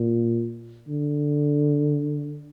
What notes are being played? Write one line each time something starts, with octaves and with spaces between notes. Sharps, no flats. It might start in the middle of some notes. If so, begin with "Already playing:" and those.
Already playing: A#2
D3